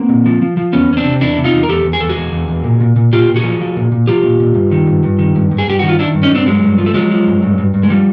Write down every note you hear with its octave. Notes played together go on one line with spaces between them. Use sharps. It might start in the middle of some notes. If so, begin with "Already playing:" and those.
Already playing: A#3 C4
A#2
F3
F3
F3
E2 B3 C#4
E2 C#4
C4 D4
C3
E2 D4 E4
C3
D#4 F4
E2
A#4
E2 G4 A4
E2
G#4
E2 A4
F#4 G#4
E2
E2
E2
A#2
A#2
A#2
A#2 F4 G4
A#2
F#4 G#4
F3
F3
A#2
A#2
F3 F4 G4
A#2
A#2
G2
D#3
G2
G2
D#3
G2
G2
G#4
G2 G4
D#3 F#4
F4
D#3 D4 E4
G2
C#4 D#4
G2 C4 D4
G2 F#3 G#3
G2
F3
A3
F3 F#3 G#3
F3
G2
G2
G2
G2
G#3
F3 G3